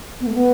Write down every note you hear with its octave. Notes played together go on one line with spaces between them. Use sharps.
B3
A3
B3